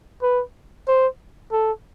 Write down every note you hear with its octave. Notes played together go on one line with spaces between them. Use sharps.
B4
C5
A4